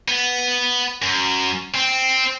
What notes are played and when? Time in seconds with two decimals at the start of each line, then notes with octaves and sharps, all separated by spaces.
0.08 B3
1.02 F#2
1.74 C4